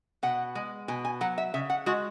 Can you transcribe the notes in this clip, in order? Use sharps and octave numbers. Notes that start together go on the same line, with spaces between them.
B2 F#5
G#3
B2 G#5
G#5
F#3 F#5
E5
C#3 E5
F#5
G#3 F#4